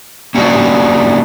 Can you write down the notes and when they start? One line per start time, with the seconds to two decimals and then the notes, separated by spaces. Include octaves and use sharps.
0.35 A#3 C#4 D4 F#4 G#4